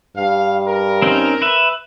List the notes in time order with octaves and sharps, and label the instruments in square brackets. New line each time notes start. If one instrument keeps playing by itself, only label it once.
[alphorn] G2 [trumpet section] F5
[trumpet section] A#4
[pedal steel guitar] C4 C#4 D#4
B4 E5